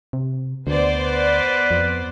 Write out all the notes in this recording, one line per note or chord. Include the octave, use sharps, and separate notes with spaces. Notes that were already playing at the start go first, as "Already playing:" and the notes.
C3
D2 B3 C5 D5
B4
F2